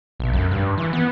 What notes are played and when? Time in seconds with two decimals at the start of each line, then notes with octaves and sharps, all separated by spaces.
0.20 B1
0.33 F#2
0.51 G2
0.77 E3
0.93 B3